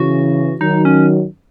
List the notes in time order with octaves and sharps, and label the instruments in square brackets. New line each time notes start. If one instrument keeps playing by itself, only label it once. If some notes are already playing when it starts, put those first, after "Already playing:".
Already playing: [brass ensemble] C#3 E3 [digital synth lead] F#4
[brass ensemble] D#3 F#3 [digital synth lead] D#4
[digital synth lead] C#4